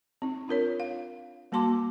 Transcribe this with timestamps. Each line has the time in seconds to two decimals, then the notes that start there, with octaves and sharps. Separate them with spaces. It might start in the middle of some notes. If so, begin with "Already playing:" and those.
0.22 C4 D#4
0.48 D4 F4 A#4 C#5
0.80 F5
1.52 G3 A#3 F#4 A5 C6 D6